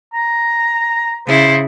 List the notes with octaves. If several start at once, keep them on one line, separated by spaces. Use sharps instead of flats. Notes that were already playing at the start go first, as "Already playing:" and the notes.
A#5
C#3 E4 C5